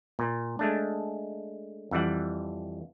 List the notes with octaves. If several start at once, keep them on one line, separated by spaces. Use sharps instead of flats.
A#2
G#3 A3 D4
F2 E3 G3 F#5